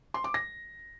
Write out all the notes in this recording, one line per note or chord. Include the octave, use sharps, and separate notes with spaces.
C6
D6
A#6